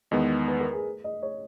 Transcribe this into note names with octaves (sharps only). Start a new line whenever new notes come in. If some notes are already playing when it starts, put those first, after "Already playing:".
E2 D#3 G#3 B3 D#5
B4
A#4
G#4
D#5
C#5